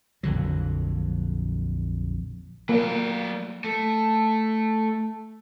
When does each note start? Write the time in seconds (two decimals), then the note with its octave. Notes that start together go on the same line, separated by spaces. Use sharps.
0.23 A#1 F2 D3 F#3
2.69 F#3 A#3 D5
3.64 A3